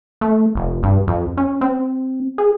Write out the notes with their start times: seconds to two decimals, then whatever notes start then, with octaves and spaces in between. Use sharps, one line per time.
0.21 A3
0.55 F1
0.83 G2
1.08 F2
1.37 C#4
1.61 C4
2.38 G#4